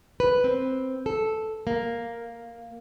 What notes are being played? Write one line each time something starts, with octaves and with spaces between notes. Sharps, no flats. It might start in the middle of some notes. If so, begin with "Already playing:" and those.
B4
C4
A4
A#3